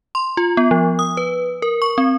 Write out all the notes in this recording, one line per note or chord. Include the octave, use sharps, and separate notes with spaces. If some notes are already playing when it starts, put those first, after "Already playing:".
C6
F4
B3
F3
D#6
B4
A#4
C#6
C4